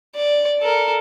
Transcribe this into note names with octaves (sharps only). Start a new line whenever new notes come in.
D5
A4 A#4